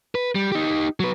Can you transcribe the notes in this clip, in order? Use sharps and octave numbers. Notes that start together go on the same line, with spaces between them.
B4
G3
D#4 G4
F#3 B4